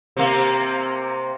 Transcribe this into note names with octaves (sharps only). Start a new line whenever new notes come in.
C3 A#3